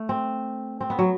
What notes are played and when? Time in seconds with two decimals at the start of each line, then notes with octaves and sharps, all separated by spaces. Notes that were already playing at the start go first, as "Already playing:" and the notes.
Already playing: A3
0.09 C4
0.81 C4
0.90 B3
0.99 F#3